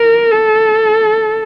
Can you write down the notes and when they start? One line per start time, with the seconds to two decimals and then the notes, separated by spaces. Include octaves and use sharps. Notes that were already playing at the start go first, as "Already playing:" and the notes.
Already playing: A#4
0.31 A4